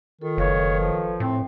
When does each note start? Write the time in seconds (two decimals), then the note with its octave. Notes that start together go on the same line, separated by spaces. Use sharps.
0.21 D#3 F4 A4
0.38 F#1 A4 B4 C#5 F5
0.79 F3
1.20 A2 C4